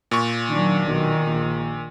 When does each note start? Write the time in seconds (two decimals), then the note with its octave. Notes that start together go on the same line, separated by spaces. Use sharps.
0.11 A#2 C#6
0.49 D#3 F#3 D4
0.86 B1 D#3
1.27 A#1